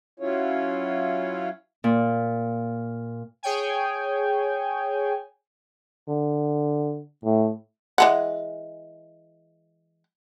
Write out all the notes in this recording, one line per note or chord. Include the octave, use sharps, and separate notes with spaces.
F#3 C#4 E4 F4 C#5
A#2
G#4 C#5 G5 G#5
D3
A2
E3 G#3 F#5